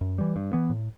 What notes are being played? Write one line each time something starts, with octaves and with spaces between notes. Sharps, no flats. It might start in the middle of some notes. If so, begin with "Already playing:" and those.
F#2
E3 G3
G2
E3 B3
A2